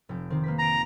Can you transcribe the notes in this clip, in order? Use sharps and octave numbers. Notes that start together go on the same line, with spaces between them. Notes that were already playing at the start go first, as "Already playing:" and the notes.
F1 G5
D#3 C4 G4
A#3 B4 B6
A#5 C7 D7